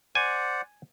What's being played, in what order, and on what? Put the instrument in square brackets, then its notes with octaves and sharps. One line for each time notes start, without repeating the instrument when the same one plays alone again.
[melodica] C5 D5 F#5 [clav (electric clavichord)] G#5